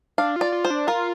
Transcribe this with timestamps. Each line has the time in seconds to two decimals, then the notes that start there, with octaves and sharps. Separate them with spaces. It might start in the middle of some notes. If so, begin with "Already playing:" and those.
0.18 D4 F5
0.36 F4 D5
0.52 F4
0.64 C5
0.70 D4
0.87 F4 A#4